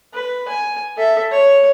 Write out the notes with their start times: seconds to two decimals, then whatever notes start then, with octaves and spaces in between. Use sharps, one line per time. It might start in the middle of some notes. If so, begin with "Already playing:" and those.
0.13 B4
0.48 G#5
0.97 A4 E5
1.32 C#5